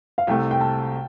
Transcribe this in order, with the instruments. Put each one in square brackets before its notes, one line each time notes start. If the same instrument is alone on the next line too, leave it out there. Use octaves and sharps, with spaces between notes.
[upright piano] F5
[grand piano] C2 C3 A3 [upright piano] G5
[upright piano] G5
A5